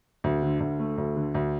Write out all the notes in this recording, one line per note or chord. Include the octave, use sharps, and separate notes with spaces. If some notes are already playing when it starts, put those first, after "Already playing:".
D2
D3
D2
A3
D2
D3
D2